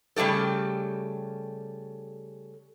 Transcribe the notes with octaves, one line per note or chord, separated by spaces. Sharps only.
C#3 G3 A3 G4 A4